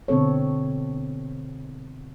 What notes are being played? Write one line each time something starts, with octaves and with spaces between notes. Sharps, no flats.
B2 D3 C4 A4 C#5